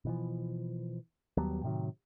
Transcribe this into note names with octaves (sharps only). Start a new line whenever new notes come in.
B2 E3 F3
D#2 F#3 G3 B3
A2 C3 D#3 F#3